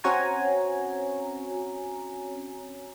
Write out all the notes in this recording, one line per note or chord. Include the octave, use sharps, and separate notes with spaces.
C4 C#4 F#4 C#5 G#5 A#5